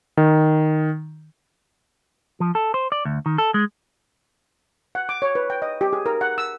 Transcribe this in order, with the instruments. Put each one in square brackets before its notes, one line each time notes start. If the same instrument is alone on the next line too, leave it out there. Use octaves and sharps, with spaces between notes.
[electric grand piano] D#3
[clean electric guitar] F3
A4
C5
D5
D2
D#3
A4
G#3
[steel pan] F#5
D6
C#5
B4
G5
D#5
G4
G#4
A#4
F#5
E6